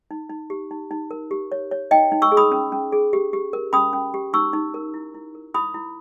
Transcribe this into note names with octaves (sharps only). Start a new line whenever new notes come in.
D#4
D#4
G4
D#4
D#4
A#4
G4
C#5
C#5
D#4 D#5 G5
D#4
C#6 E6
G#4
B5 D#6
C#4
C#4
G#4
G4
G4
A#4
C#4 B5 D#6
C#4
G4
D#4 C#6 E6
D#4
A#4
E4
E4
A#4
E4 B5 D#6
E4